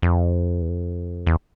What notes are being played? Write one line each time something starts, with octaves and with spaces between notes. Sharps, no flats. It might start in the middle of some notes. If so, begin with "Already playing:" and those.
F2
E2
F2
E2